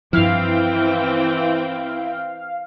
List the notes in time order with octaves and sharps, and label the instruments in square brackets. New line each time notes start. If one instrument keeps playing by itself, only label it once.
[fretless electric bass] G2 F3 [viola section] E3 C4 G5 [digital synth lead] E4 [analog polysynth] F5